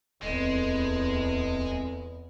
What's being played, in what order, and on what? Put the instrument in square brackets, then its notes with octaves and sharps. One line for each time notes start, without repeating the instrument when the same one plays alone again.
[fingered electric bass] D1 [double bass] E2 [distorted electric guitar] G#3 [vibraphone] C4 A4 D#5